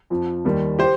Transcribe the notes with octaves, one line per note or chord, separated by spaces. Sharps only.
F2 F3
D#2 D#3 G3
G4 C5